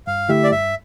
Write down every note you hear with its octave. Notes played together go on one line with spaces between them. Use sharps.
G2 F5
D3 A3 E4 G4 E5
D5
G2 E5